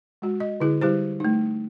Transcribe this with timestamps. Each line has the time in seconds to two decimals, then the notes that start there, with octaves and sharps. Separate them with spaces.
0.22 G#3 F#4
0.40 D#5
0.60 D3 E4 G#4
0.81 G3 E4 G4 C5
1.20 A3 D#4